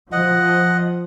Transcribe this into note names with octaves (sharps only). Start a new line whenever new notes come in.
F3 D#5 F#5